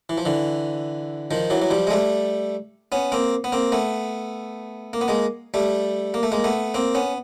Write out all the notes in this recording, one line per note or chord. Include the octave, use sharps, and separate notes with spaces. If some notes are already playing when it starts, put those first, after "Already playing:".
E3
F3
D3 E3
D#3 F3
E3 F#3
F#3
F3 G3
G#3
G3 A3
B3 C#4
A#3 C4
B3
A#3 C4
A3 B3
A#3
B3
G#3 A#3
G3 A3
A#3
A3
G#3 A#3
A3 B3
A#3 C4
B3 C#4